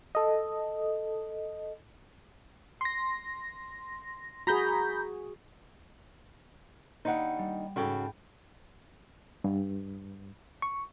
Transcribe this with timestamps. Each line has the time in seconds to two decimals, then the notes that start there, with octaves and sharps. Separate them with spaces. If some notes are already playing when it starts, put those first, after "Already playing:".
0.15 A4 D#5
2.81 C6 A#6
4.47 F#4 G#4 A#5 B5 G6
7.05 D#2 D4 D#4 F#5 B5 G6
7.39 G3
7.76 G#2 C#3 F#4 A4 G5 B5
9.44 G2
10.62 C#6